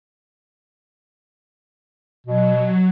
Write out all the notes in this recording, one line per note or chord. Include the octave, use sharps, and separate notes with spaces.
B2 F#3